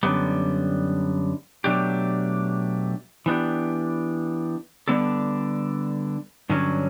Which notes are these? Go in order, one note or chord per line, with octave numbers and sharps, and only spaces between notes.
F#2 D3 G3 B3
B2 F#3 A3 D4 G4
E3 B3 D4 G4
D3 G3 B3 D4 A4
G2 D3 F#3 C#4